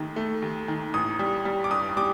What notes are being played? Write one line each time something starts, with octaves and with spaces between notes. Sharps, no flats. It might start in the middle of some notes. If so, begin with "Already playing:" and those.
Already playing: D#2 D#3 A3
A3
D#2
D#3
A1 D#6
G3
G3
D6
G2 D#6
G3 D6